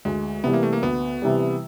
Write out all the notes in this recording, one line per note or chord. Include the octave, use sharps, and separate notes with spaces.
D2 G#3
C3 E3 G3 B3
A#3
A3
A#3
D2 B3
C3 E3 G3